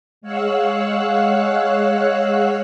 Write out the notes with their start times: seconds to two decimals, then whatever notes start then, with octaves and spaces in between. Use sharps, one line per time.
0.21 G#3 C#5 F5 F#5 E6 F#6